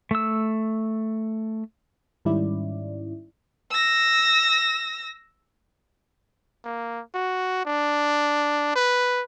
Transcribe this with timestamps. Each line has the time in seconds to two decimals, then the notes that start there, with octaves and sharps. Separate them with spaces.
0.11 A3 E6
2.25 G#2 D#3 G3 C#4 E4 D5
3.71 E6 A#6
6.64 A#3
7.15 F#4
7.66 D4
8.76 B4